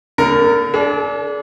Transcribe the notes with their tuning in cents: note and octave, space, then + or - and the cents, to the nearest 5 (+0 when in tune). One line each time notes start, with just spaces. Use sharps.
D3 -35 A#3 +0 A#4 +0
D4 -25 G#4 +40